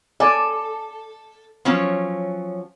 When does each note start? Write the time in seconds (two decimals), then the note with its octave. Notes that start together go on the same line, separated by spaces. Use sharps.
0.20 A4 D5 G#5
1.65 F3 F#3 C#4